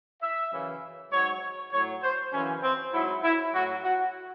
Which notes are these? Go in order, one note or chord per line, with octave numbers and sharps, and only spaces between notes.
E5
F#2 C#3 E3
G#2 F#3 C#5
A2 F#3 C#5
C5
F#2 C#3 E3 C#4
C4
G#2 F#3 E4
E4
A2 F#3 F#4
F#4